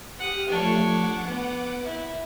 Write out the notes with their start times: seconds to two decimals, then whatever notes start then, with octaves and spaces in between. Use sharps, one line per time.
0.19 G4 F#5 D#6 F6
0.49 F3 A3 D4 C#5
0.84 F#5 D6
1.27 B3
1.84 E4